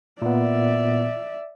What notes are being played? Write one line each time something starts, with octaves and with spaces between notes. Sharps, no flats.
A#2 B3 D5 E5